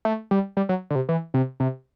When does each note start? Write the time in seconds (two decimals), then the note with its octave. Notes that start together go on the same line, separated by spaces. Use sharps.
0.05 A3
0.31 G3
0.57 G3
0.69 F#3
0.90 D3
0.95 C3
1.09 E3
1.34 C3
1.60 C3